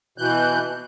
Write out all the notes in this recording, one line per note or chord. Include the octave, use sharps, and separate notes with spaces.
B2 E3 F#6 G6